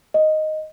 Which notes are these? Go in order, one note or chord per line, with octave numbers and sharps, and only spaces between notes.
D#5